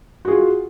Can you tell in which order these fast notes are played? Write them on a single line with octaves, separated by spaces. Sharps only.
F#4 G#4 F4